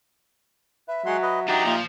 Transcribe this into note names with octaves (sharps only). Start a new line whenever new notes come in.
B4 E5
F#3 G#3 F#5 C6
B4 D#5
E3 F#3 D4 D#4 G4 A#5
A#2 F3